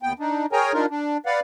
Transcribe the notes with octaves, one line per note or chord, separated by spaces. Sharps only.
D#2 B3 G5
D4 D#4
G#4 A#4 C#5 G5 G#5 A#5
D4 D#4 F4 A#4
D4
B4 D5 F5 F#5